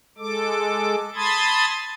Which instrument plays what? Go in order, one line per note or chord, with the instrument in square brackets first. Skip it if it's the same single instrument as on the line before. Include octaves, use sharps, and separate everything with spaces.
[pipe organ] G#3 A4 D6
A5 B5 C6 D#6 G#6 A6